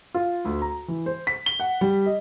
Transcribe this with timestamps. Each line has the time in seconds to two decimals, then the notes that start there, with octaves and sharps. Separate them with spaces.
0.14 F4
0.45 D2
0.62 A#5
0.88 E3
1.06 C5
1.27 B6
1.46 G7
1.60 F#5
1.81 G3
2.06 D#5